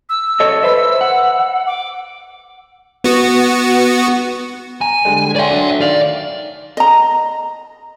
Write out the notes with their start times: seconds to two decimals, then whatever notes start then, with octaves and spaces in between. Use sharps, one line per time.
0.09 E6
0.40 A4 C#5 D#5
0.63 B4 C5 E5 E6
1.01 F#5
1.67 D6
3.04 B3 F#4
4.81 G#5 A#5
5.05 D3 G3 G#3
5.36 C#5 D5 E5 G5 C6
5.50 F#3 A3 D4
5.81 D#3 D5 F5 F7
6.77 D#5 A#5